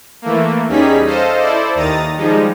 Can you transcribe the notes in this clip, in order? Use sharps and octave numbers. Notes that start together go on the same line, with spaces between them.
E3 A3 A#3
E2 G3 C#4 D#4 G#4 B6
A4 C5 D#5 F5
E4 A4 C5 D5
D#2 D#3 A#5 D#6 A6
F3 G3 G#3 D#4